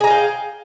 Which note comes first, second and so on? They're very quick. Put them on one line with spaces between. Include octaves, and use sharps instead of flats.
G#4 A#5 F5 G5